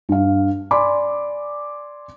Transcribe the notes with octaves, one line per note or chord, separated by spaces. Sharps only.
G2 F5
D5 G#5 B5 C6 D6